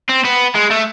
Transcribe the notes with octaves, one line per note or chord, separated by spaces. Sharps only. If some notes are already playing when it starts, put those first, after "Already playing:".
C4
B3
G#3
A3